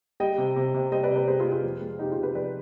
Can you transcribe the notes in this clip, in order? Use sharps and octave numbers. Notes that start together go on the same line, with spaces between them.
G3 D#5 G5
C3
C3
C3
G3 C5 D#5
B4 D5
C3
B4 D5
G3 G#4 C5
F4 G#4
G3
F4 G#4
F2
G#3
C3 D#4 G4
F4 G#4
C3
G4 B4
F3 B4 D5